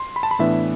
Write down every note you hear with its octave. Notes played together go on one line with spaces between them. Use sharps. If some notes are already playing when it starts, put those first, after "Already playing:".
Already playing: C6
B5
A5
B5
A2 E3 B3 D4 E5